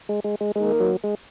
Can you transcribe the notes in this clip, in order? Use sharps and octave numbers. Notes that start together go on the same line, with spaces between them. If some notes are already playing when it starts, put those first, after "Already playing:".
G#3
G#3
G#3
D#3 G#3 A#3 D#4 A#4
F#3
G#3